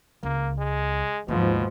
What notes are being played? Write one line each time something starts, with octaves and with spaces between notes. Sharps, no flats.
C#2 A#3
G#3
D#2 G#2 B2 F3 G#3